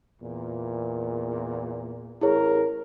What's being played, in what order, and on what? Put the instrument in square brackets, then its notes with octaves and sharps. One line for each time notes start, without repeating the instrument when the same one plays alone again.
[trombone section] E2 A#2
[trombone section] A1 A#4 [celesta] E4 G#4 C#5